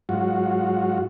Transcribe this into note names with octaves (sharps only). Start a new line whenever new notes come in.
G#2 F#3 F4 F#4